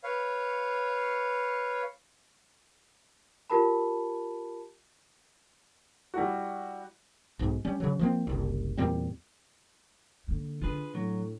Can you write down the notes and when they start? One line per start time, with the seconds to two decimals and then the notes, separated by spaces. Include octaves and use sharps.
0.04 B4 C#5 F5
3.50 F4 G4 A#4 A5 B5
6.14 G3 E4 F#4
7.39 B1 G#2
7.65 G3 C#4
7.80 C#3 F#3
7.99 F3 A#3 C4
8.27 F#1 C2
8.77 E2 A#2 G3 C4
10.28 D3 A#3
10.62 D4 F4 G#4 B4
10.95 A2 F#3